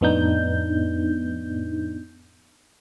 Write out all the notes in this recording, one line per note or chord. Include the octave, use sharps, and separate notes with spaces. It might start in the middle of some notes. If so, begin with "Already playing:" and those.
F2 A2 B3 D4 D#4 G6